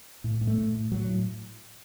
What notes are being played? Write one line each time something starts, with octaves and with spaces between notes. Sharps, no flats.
A2
A2
A3
A2
A2
A2 F#3
A2